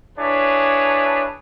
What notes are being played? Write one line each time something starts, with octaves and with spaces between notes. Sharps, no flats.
D4 E4 G#4 B4 C#5